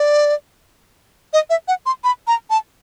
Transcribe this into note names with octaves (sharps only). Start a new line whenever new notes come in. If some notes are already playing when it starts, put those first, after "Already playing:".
Already playing: D5
D#5
E5
F#5
C6
B5
A#5
A5